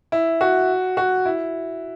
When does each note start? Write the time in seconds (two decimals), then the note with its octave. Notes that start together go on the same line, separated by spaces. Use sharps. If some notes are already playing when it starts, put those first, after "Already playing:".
0.12 E4
0.41 F#4
0.97 F#4
1.25 E4